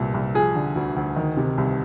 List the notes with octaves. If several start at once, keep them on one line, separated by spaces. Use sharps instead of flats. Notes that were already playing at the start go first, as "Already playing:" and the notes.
Already playing: C2 A#2
C2
F3 G#4
D3
D2
D2
D#3
C3
C2